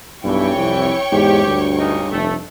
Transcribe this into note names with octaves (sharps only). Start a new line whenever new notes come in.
B1 G2 E3 E4 C#5 G5 C#6
C2 F2
E2 G#2 G4
D2 G2
C#2 D#4
F1 A3